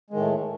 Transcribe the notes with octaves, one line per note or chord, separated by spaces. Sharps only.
A2 D#3 G#3 A3